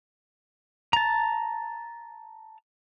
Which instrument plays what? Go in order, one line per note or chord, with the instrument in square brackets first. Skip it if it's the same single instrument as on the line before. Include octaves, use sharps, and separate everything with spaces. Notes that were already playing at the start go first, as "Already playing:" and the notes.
[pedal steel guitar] A5 A#5